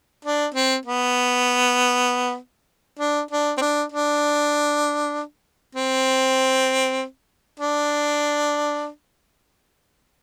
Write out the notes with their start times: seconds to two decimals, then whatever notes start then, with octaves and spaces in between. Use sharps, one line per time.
0.25 D4
0.54 C4
0.85 B3
2.99 D4
3.31 D4
3.58 C4
3.61 D4
3.92 D4
5.75 C4
7.60 D4